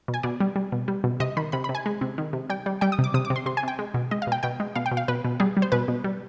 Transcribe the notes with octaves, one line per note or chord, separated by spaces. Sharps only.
B2
G#5
B2 D5
G3
G3
B2
G3
B2
C3 D#5
D#3 B5
C3 B5
B5
C3
G#5
G#3
C3
D#3
C3
G3 G5
G3
G3 G5
D#6
C3
D6
C3 D#6
D6
C3
C6
C3 C6
G#5
C3 G5
G#3
B2
G#3 D#5
F5
B2 G5
B2 G5
G#3
B2 F5
G5
B2
F5
B2 B4
B2
G3 G#4
G3
C5
B2 B4
B2
G3